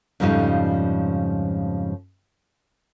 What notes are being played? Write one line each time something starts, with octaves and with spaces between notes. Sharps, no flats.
F2 G#2 C#3 F3 G3 D#4